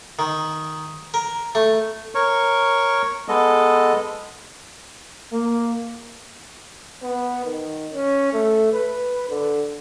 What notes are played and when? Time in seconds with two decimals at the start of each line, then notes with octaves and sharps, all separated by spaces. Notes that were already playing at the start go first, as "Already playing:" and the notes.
0.19 D#3
1.14 A#4
1.55 A3
2.15 A#4 C#5 C#6
3.28 G#3 B3 A4 D#5
5.32 A#3
7.02 B3
7.45 D#3
7.93 C#4
8.33 A3
8.73 B4
9.29 D3